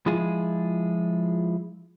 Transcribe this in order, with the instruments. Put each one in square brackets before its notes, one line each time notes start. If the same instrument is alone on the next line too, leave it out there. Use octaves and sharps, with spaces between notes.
[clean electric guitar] F3 G#3 E4 F4 G#4